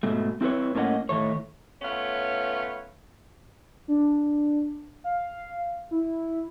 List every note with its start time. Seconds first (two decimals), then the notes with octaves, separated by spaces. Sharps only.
0.03 G#2 B2 A3
0.41 C4 E4 F#4 B4 C#5
0.75 A2 A#3 C#4 A4 D#5 F#5
1.09 A2 D#3 A3 C#5
1.82 A3 B3 C#4 F4 B4 C#5
3.88 D4
5.04 F5
5.91 E4